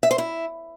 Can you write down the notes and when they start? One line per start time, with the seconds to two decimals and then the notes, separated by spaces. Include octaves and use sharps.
0.03 E5
0.11 C5
0.18 E4